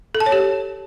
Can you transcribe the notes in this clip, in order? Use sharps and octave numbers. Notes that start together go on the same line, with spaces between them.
A4
A5
C#5
G4